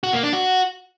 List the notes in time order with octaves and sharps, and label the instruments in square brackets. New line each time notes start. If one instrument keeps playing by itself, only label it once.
[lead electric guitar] F#4
A#3
D4
F#4